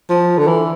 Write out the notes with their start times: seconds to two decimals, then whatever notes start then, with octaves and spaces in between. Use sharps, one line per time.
0.10 F3
0.38 D3
0.47 E3